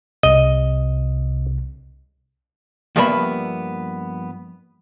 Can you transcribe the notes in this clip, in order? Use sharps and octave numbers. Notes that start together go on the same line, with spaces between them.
C2 C3 D#5
G2 F3 A#3 B3 E5 B5